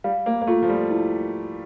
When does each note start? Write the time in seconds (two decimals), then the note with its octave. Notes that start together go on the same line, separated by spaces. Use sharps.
0.04 G3 F5
0.26 A#3
0.41 A#3
0.47 A3 F4
0.63 F3
0.69 G3
0.91 E4